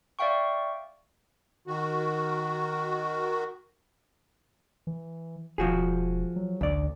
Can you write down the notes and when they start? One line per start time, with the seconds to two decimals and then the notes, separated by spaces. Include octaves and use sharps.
0.19 D5 E5 F5 G5 C#6
1.67 D#3 F#4
4.87 E3
5.58 E1 F3 F#4 G#4
6.36 F#3
6.61 A1 D2 D5